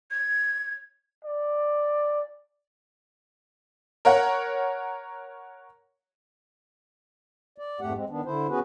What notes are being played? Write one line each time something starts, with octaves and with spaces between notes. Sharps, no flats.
G#6
D5
A#4 C#5 F#5
D5
F2 G#2 A3 G4 F#5
G#3 C4
D#3 B3 D4
D3 E4 C5
B3 C#4 F#4 G#4 B4